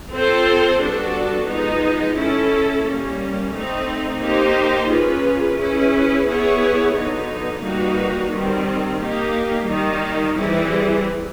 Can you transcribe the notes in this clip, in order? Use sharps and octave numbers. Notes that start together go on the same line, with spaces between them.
C4 F4 A4 C5
G3 B3 D4 F#4 A4
F3 G#3 B3 D#4
C#4 E4 A4
G3 A#3 C#4
A3 C4 D#4
A#3 D#4 G4 C5
A#3 C#4 F4 G#4 B4
C#4 E4 G#4 B4
B3 E4 G#4 C#5
D3 F#3 B3 D#4
G3 A#3 D#4 F#4 B4
D#3 G3 C4
A#3 D#4 G4
D#3 G3 A#3 D#4
E3 G3 C4 E4 G#4